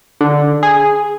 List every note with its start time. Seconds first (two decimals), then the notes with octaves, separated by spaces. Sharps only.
0.21 D3
0.63 G#4